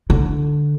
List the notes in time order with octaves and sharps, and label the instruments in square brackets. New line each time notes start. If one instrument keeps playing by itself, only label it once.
[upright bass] D3